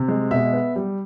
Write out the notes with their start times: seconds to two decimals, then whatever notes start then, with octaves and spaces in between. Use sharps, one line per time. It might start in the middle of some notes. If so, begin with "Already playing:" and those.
Already playing: C3
0.08 G#3
0.31 B2 E5
0.53 B3
0.76 G3